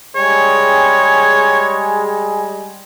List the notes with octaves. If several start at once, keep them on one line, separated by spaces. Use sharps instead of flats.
G3 G#3 G#4 C#5